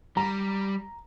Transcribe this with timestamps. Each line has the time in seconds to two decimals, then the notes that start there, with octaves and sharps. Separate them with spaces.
0.17 G3 A#5